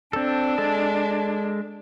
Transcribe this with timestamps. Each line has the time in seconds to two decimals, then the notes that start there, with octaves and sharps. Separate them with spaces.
0.13 C4 D4 A4
0.58 G#3 A4 A5